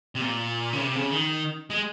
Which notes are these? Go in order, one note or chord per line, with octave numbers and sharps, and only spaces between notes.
C3
A#2
C#3
C3
C#3
D#3
G#3